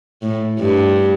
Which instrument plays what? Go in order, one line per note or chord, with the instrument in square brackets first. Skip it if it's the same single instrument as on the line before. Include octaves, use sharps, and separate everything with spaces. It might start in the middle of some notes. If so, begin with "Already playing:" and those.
[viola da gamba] A2
G2